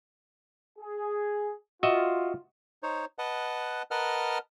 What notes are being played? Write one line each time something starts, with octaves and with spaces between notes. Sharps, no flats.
G#4
F4 F#4 D#5 E5
D#4 C5 C#5
B4 D#5 F#5 A5
A#4 B4 D#5 F#5 A5 F6